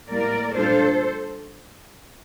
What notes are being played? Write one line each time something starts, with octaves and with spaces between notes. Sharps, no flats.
A2 G3 A#3 A#4 D5
A#2 G3 D4 F4 A4 C5